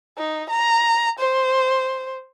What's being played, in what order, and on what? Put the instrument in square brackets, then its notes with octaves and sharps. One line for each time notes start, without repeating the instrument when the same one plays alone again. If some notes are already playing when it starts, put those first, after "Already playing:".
[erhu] D#4
A#5
C5